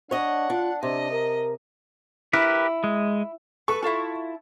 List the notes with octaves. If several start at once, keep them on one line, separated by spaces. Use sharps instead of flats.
D4 C#5 D#5 F#5
D4 F4
C3 D4 D#5
A#4
E4 G4 A#4 B4
G#3
A4 B4 C#6
E4 F4 A4 F5 A5